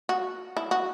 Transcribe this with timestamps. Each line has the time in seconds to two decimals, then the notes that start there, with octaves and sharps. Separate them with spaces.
0.09 F#4
0.57 E4
0.71 F#4